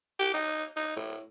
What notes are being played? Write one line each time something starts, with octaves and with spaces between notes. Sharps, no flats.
G4
D#4
D#4
A2